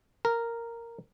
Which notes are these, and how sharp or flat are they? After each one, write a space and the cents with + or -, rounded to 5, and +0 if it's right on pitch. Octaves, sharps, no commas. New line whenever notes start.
A#4 -5